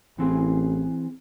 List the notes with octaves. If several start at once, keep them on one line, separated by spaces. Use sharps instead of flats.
A1 E3 C4 G#4